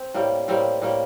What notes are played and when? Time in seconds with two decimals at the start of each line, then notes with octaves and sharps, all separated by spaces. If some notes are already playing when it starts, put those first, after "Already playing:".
Already playing: C4
0.14 A2 G3 A#3
0.48 A2 G3 A#3 C4
0.82 A2 G3 A#3